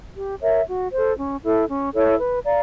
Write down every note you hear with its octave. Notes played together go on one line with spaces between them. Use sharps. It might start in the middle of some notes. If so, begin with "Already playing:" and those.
G4
A#4 C#5 E5
F#4
A4 C5
C#4
E4 A4
C#4
E4 A4 C#5
B4
D5 F5 A#5